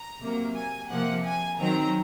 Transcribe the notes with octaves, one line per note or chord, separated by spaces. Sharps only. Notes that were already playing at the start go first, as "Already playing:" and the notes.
Already playing: A#5
C3 F#3 A#3
G#5
C3 F3 A#3 F#5
G#5
D#3 F#3 C4 A#5